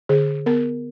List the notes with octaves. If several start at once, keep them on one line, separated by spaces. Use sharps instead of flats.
D3 G#4
B3 A#4